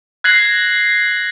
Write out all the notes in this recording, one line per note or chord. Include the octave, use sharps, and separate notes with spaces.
F#6 G#6 A#6 C7 F#7